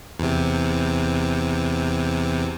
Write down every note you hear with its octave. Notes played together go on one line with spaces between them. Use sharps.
E2 C3